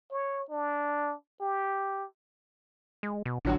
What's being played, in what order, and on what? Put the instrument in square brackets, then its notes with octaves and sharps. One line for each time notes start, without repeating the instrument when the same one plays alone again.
[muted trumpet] C#5
D4
G4
[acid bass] G#3
B2
[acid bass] A1 [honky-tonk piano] D3 F#3 F#4